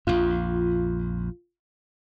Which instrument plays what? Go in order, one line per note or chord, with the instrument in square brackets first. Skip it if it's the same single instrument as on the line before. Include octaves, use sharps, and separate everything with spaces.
[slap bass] A#1 F2 [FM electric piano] F4